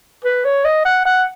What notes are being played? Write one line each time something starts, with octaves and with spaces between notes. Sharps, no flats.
B4
C#5
D#5
F#5
F#5